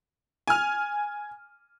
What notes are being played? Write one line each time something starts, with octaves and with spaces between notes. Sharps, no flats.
G#5 F6